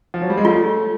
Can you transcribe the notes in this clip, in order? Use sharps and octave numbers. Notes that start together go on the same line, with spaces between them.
F3
F#3
G3
G#3
A3 F4